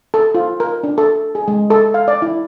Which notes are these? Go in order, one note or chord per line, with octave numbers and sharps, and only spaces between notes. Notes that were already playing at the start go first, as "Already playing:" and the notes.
A4
F4
A#4
D4
A4
G#4
G#3
A4
F5
D5
E4